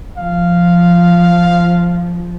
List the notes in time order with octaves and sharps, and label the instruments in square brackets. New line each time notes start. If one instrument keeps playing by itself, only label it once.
[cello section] F3 [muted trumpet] F5